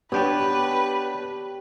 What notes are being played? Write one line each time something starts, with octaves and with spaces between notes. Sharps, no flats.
B3 D4 G4 B4 C#5 G5 A5